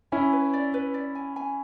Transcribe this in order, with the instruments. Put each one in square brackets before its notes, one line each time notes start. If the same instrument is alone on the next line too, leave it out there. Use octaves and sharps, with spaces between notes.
[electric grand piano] C#4 E4 [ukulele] G#5
[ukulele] B4
D5
B4
D5
G#5
G#5